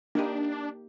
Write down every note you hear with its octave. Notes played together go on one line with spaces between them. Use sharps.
A#3 D4 D#4 G4